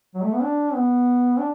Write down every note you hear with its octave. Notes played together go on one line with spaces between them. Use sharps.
F#3
A3
B3
D4
B3
D4